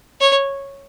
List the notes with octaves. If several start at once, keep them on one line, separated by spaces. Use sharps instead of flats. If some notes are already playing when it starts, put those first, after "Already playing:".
C#5